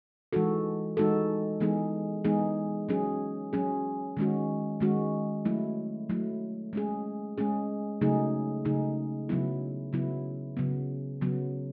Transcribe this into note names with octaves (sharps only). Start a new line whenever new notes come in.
E3 G#3 D#4 F#4 A4
E3 G#3 D#4 F#4 A4
E3 G#3 B3 D#4 G#4
E3 G#3 B3 D#4 G#4
F#3 C#4 G#4
F#3 C#4 G#4
D#3 G#3 C#4 F#4
D#3 G#3 C#4 F#4
F#3 A3 E4
F#3 A3 E4
G#3 C#4 G#4
G#3 C#4 G#4
C#3 F#3 A3 D#4 G#4
C#3 F#3 A3 D#4 G#4
C#3 F#3 B3 E4
C#3 F#3 B3 E4
C#3 F#3 B3
C#3 F#3 B3